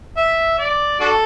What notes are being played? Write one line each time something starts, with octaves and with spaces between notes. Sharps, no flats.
E5
D5
D4 F#4 A4